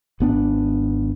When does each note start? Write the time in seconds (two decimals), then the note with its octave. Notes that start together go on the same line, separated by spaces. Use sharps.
0.20 G#1 B3 D4